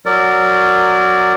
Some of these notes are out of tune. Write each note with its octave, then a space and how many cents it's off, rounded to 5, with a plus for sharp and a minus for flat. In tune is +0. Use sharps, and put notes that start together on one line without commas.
F#3 +0 A#4 -20 D5 +0